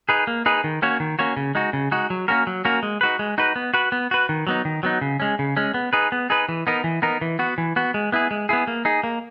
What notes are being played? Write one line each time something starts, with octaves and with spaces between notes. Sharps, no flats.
D#4 G#4 B4
A#3
D#4 G#4 B4
D#3
A#3 C#4 F#4 C#5
D#3
A#3 C#4 F#4 C#5
C#3
G#3 D#4 F#4
C#3
G#3 D#4 F#4
F#3
A#3 C#4 F#4 A#4
F#3
A#3 C#4 F#4 A#4
G#3
D#4 F#4 B4
G#3
D#4 F#4 B4
B3
F#4 B4
B3
F#4 B4
D#3
F#3 B3 D#4
D#3
F#3 B3 D#4
C#3
G#3 C#4
C#3
G#3 C#4
B3
D#4 G#4 B4
B3
D#4 G#4 B4
E3
B3 D#4 A#4
E3
B3 D#4 A#4
E3
B3 F#4
E3
B3 F#4
G#3
B3 E4 G#4
G#3
B3 E4 G#4
A#3
D#4 G#4
A#3